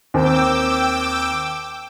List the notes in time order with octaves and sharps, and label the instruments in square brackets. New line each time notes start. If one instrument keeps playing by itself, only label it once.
[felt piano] D#2 C4 [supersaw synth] G5 D6 E6